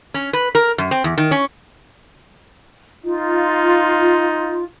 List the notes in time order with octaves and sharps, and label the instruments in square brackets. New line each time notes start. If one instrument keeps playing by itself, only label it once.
[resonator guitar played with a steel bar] C#4
B4
A#4
F#2
C4
E2
D#3
C#4
[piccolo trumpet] D#4 [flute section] F4